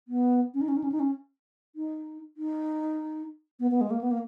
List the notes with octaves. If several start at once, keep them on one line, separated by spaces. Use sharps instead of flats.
B3
C#4
D#4
C#4
D#4
C#4
D#4
C#4
D#4
D#4
B3
B3
G#3
A#3
B3
A#3